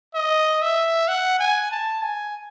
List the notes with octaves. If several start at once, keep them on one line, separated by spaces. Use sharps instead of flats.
D#5
E5
F#5
G#5
A5
G#5